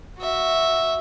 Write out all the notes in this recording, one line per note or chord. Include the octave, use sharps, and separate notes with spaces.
F#4 E5